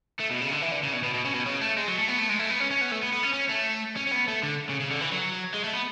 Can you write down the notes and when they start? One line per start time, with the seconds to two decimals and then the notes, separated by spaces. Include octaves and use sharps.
0.20 A3
0.31 B2
0.42 C#3
0.52 D3
0.62 E3
0.72 D3
0.83 C#3
0.93 B2
1.03 B2
1.14 B2
1.25 C#3
1.34 B2
1.46 C#3
1.61 A3
1.77 G#3
1.88 F#3
1.98 A3
2.08 B3
2.19 A3
2.29 G#3
2.40 A3
2.50 B3
2.60 C#4
2.71 C#4
2.81 B3
2.92 A3
3.03 B3
3.13 B3
3.23 C#4
3.33 C#4
3.49 A3
3.97 C#4
4.07 C#4
4.12 B3
4.28 A3
4.43 D3
4.69 C#3
4.80 C#3
4.91 D3
5.01 E3
5.12 F#3
5.54 G#3
5.64 A3
5.74 B3